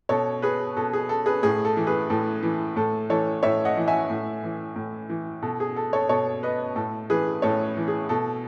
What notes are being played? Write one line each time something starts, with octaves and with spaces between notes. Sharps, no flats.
B2 A4 C#5
G#4 B4
B2 A4
G#4
A4
G#4 B4
A2 G#4
A4
E3
G#4 B4
A2 A4
E3
A2 A4
E3 A4 C#5
A2 C#5 E5
D#5 F#5
E3
E5 G#5
A2
E3
A2
E3
B2 A4
G#4
A4
A4 C#5
B2 A4 C#5
B4 D#5
A2 A4
E3 G#4 B4
A2 A4 C#5
E3
G#4
B2 A4